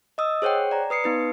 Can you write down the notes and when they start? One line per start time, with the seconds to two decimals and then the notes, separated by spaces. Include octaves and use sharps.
0.18 D#5 D#6 E6
0.42 G#4 C5 C#5 F#5 G5
0.71 D5 A#5
0.90 B4 D#6 C7 C#7
1.04 B3 D#4 B4